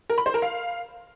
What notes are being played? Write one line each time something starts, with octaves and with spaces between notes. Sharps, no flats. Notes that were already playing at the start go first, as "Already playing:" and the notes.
A#4
B5
C5
A#4
F5